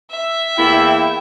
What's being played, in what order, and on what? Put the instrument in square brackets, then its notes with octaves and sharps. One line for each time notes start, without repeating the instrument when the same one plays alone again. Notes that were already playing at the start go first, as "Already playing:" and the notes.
[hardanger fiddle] E5
[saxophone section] E2 A#3 E4 [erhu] G5